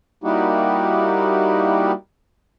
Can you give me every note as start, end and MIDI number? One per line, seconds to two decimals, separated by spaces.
0.24 1.92 55
0.24 1.92 58
0.24 1.92 63
0.24 1.92 64
0.24 1.92 66
0.24 1.92 67